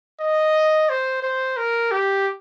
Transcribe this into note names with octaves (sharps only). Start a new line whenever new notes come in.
D#5
C5
C5
A#4
G4